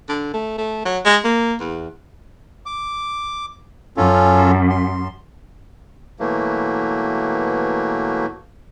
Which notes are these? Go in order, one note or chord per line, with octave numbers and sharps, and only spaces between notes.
D3
A3
A3
F#3
G#3
A#3
E2
D6
F#2 C#4 F4 A4
C6
B2 E3 F#3 A3 A#3